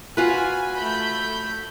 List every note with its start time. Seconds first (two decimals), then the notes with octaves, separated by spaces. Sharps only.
0.17 F4 F#4 B4 G#5 B5
0.77 A3 B5 G6